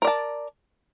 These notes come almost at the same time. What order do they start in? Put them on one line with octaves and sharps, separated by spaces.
A#4 D5 A5